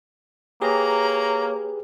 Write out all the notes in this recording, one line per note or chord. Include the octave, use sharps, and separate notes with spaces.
A#3 G4 G#4 B4 C#5 A#5